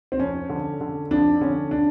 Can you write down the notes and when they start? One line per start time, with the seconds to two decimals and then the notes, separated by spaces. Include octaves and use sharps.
0.12 C4
0.19 F2 C#4
0.49 D3
0.80 D3
1.11 F2 D4
1.41 D3 C#4
1.71 D4